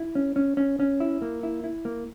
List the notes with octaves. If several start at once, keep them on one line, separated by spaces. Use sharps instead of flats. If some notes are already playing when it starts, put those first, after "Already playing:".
Already playing: E4
C#4
C#4
C#4
C#4
E4
A#3
E4
E4
A#3